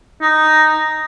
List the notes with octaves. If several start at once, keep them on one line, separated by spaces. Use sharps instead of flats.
D#4